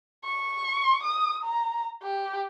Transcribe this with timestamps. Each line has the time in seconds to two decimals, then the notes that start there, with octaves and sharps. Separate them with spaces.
0.25 C#6
1.03 D#6
1.44 A#5
2.03 G4